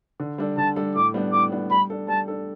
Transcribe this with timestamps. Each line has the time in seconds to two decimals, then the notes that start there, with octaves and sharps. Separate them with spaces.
0.20 D3
0.38 G3 D4 A4
0.57 D3 A5
0.76 G3 D4 A4
0.95 A2 D6
1.14 G3 B3 D4
1.32 A2 D6
1.52 G3 B3 D4
1.71 G3 B5
1.90 D4 A4
2.08 G3 A5
2.28 D4 A4